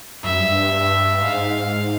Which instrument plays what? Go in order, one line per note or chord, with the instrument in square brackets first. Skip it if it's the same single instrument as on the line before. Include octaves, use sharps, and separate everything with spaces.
[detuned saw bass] F#2 [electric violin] E5
[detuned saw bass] G2
[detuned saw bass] G#2 [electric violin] F5